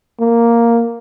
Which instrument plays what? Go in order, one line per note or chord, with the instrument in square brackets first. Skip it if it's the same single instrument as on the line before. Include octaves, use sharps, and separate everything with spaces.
[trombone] A#3